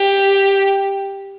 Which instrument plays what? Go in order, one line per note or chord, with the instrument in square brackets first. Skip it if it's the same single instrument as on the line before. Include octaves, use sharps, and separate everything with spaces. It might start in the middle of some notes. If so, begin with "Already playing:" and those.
Already playing: [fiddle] G4